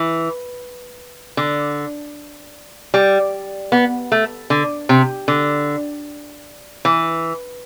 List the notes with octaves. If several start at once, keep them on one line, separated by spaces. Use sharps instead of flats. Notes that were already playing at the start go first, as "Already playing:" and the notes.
Already playing: E3
D3
G3
B3
A3
D3
C3
D3
E3